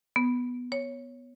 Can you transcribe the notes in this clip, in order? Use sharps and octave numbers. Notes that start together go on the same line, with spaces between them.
B3
C#5